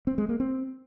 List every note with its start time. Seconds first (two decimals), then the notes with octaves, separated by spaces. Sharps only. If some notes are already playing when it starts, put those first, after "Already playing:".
0.07 C4
0.18 G#3
0.29 A#3
0.40 C4